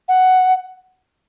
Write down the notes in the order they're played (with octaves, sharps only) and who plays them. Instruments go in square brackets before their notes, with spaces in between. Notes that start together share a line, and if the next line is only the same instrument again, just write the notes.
[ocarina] F#5